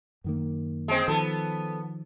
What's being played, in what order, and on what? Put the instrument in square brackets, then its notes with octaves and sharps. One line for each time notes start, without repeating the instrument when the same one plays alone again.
[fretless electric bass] F#2 D#3 A#3
[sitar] G#3 C4
[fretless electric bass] D#3 F3 [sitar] B3 A4